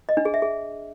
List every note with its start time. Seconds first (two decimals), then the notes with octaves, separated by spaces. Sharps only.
0.09 D#5
0.17 D4
0.25 G#4
0.34 E5
0.42 G#4